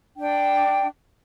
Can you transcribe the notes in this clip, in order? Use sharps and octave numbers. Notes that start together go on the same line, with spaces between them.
D4 G5